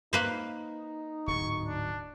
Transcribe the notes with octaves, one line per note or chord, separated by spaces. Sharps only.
A#3 D#4 B4 C5
D1 G#2 C#6
D4